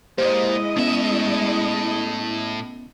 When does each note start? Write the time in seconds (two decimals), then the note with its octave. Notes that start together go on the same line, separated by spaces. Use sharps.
0.18 A#2 G#3 E4 G4 C5 D#5
0.76 A2 B3 C#4 E5